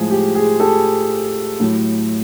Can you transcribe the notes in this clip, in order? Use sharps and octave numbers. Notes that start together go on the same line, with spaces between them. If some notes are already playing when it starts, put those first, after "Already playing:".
Already playing: A2 F3 G#3 G#4
G4
G#4
G4 A4
A2 F#3